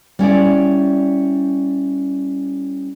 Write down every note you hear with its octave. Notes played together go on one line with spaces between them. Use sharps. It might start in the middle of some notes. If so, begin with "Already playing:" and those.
G3 C#4 E4 D5